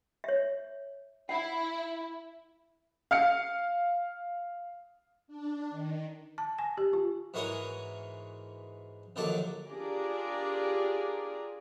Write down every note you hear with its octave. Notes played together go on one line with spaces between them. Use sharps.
C#5 E5
E4 F#5
F5 F6 C#7
D4
D#3
A5
G#5
G4
F4
G#2 E3 F#4 A#4 C#5 D#6
A#1 D3 D#3 F#3 A5 D6
D4 F4 G4 G#4 A#4 D5